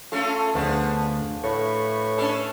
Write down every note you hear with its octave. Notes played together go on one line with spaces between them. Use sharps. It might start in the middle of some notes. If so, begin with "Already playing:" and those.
A3 C#4 F4 A4
D2 F3 B3 D4 G#4
A2 B4 C#6
C#4 D4 A4